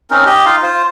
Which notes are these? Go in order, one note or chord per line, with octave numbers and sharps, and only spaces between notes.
C4 C#4 D#4 A#4
G4 D#5
D#4 F4 F5
F4 C5